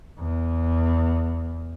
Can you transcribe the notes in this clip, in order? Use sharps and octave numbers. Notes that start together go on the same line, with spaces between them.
E2